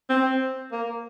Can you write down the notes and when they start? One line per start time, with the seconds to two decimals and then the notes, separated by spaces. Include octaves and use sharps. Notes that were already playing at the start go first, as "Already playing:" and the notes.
0.09 C4
0.72 A#3